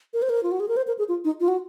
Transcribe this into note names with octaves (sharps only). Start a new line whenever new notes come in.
A#4
C5
A#4
F4
F#4
G#4
A#4
C5
A#4
G#4
F4
D#4
F4
F#4